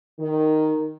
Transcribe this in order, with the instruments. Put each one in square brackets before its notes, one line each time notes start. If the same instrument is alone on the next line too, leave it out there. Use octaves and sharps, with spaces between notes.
[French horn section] D#3